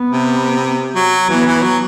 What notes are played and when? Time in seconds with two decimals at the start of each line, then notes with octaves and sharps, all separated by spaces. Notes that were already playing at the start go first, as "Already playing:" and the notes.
Already playing: B3
0.10 C3
0.95 F#3
1.29 E3 B3
1.46 E3
1.63 F#3